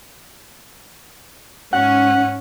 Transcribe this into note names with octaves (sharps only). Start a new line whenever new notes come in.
G#2 C#4 F#5